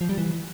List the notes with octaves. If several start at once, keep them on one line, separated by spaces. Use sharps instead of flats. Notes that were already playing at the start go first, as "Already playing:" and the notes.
F3
G3
E3